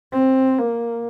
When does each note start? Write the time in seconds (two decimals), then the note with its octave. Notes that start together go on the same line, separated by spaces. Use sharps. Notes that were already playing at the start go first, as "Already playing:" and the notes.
0.13 C4
0.59 A#3